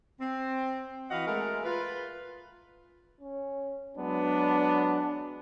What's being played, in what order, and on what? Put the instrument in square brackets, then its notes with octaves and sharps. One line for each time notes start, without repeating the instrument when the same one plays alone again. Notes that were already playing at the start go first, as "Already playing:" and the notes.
[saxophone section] C4
E3 F#4 B4 D#5 F5 F#5
G#3 A3 A#4
F4 B4
[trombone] C#4
[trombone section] F#3 G#3 B3 [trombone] D4